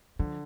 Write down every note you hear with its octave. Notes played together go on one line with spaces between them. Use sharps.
D3 F3